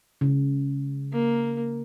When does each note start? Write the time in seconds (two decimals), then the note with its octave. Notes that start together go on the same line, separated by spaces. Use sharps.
0.21 C#3
1.13 A#3